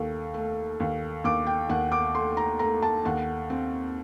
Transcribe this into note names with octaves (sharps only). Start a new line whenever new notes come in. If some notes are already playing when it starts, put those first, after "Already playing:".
Already playing: D#2 A3
A3
D#2
D#2 D6
G5
D#2 F#5
D6
A3 C6
A#5
A3 A#5
A5
D#2 F#5
C4